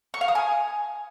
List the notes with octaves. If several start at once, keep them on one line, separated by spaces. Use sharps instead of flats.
C#6
F5
D#6
G#5